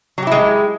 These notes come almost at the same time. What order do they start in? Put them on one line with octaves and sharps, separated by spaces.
F#3 G4 E4 G#3